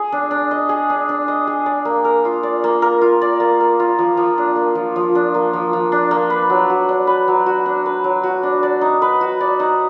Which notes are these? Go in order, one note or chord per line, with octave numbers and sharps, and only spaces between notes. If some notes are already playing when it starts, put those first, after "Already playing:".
Already playing: G#4
D4
D4
D#5
G#4
D4
D4
D#5
G#4
D5
A#3
A#4
F4
D5
A#3
A#4
F4
D5
A#3
A#4
F4
F3
F3
D4
A#3
F3
F3
D4
A#3
F3
F3
D4
A#3
B4
F#3
F#4
D4
B4
F#3
F#4
D4
B4
F#3
F#4
D4
D5
D#4
B4
F#4
D5
D#4